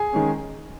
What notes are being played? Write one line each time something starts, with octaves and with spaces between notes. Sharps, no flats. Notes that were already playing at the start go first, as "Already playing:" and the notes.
Already playing: G#4 G#5
D#3 G#3 C#4